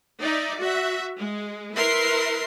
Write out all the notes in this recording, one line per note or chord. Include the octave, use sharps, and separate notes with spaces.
D#4 D5 E5
F#4 E5
G#3
E4 A#4 B4 E5 C6